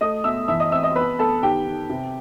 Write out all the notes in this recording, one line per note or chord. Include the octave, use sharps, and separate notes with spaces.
A3 D#5 D#6
B2 E5 E6
E3 E5 E6
D#5 D#6
C4 E5 E6
D#5 D#6
B3 B4 B5
B3 A4 A5
D#3 G4 G5
D#3
C3